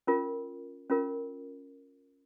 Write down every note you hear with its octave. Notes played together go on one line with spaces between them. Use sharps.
C#4 F4 A#4
C#4 F4 A#4